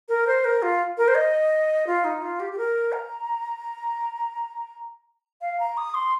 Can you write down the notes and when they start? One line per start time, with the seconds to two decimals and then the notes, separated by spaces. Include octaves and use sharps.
0.09 A#4
0.27 C5
0.45 A#4
0.62 F4
0.98 A#4
1.08 C5
1.15 D#5
1.87 F4
2.04 D#4
2.22 F4
2.40 G4
2.52 G4
2.58 A#4
2.93 A#5
5.41 F5
5.60 A#5
5.77 D#6
5.94 C6